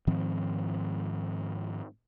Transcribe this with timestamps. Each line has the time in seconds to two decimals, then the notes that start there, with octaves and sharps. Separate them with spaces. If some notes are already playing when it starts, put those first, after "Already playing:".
0.07 G#2 D#3 F3 C4